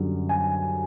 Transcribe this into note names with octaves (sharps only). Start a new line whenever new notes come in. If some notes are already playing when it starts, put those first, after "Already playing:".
Already playing: F#2 D3 G3
G#5